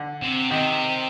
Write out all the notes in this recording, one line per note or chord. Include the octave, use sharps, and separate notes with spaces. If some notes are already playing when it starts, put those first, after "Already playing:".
Already playing: D3
C3
C3 D#3